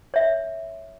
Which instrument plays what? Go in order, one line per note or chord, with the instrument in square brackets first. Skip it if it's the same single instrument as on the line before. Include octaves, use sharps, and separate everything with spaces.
[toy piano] C#5 E5